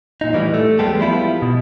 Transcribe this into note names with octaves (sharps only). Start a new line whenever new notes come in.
A#2 D#4
A2 E3 G3
A3
E2 G3 G#3 B3 G4 A4
F3 G3 B3 E4 F4
B2